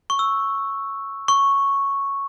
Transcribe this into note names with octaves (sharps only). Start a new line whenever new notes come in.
C#6
E6
C#6